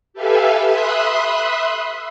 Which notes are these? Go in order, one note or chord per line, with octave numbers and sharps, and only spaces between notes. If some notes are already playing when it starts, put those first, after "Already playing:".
G4 A4 B4 E5 F5 G#5
E5 B5 C6 D#6 F#6